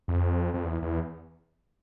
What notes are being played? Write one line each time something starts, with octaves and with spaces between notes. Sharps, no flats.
F2
F2
E2
E2